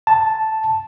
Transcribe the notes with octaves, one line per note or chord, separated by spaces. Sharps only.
A5